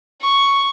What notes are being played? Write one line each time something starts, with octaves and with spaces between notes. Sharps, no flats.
C#6